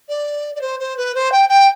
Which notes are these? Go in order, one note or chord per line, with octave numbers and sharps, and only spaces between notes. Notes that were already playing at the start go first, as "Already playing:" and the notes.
D5
D5
C5
C5
B4
C5
G5
G5